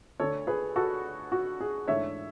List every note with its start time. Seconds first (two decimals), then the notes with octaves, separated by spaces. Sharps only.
0.20 D2 D3 A3 D4 A4 C#5
0.47 G#4 B4
0.76 F#4 A4
1.32 F#4
1.61 G#4
1.88 G#2 E3 A3 D4 C#5 E5